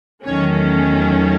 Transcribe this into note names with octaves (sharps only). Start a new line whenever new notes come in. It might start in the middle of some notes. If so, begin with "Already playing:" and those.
E2 D#3 F#3 A3 C#4 C#5